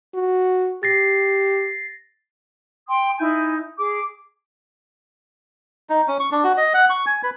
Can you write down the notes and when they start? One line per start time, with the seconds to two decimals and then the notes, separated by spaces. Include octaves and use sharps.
0.14 F#4
0.83 G4 A6 A#6 C7
2.86 G5 C6 D#6
3.18 D#4 E4 G#5 G6
3.78 G#4 D6
5.90 D#4
6.08 C#4
6.20 C#6
6.32 D4
6.44 F#4
6.57 D#5
6.74 F#5
6.90 C#6
7.06 G#5
7.23 B4